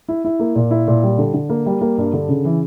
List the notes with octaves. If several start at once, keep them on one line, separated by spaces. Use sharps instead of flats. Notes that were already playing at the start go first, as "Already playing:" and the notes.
E4
E4
A#3
A#2
E4
A#2
G3
D3
D3
A#3
G3
A#3
G2
D3
C#3
E3